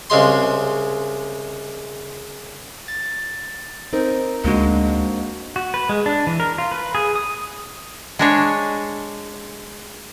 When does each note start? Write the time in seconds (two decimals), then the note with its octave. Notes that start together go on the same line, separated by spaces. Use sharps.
0.10 C2 C#3 G#3 C6
2.88 A6
3.93 C4 D#4 A#4
4.44 D2 G#3 A#3 D4 F#4
5.56 F#4
5.74 B4
5.89 G#3
6.06 D4
6.27 E3
6.40 A#4
6.58 F4
6.72 B4
6.95 G#4
7.16 D#6
8.19 G#3 D4 C#5